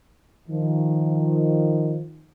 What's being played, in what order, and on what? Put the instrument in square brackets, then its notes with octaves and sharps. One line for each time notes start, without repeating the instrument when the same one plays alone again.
[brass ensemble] D#3 F3